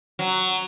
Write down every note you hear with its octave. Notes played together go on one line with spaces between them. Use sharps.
F#3